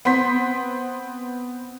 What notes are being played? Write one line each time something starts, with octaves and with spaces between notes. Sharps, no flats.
B3 C4 C6 B6